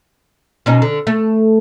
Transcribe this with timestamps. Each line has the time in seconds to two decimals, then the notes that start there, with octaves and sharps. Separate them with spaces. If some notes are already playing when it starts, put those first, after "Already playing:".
0.66 B2 C#4 D#4
0.82 D3
1.07 A3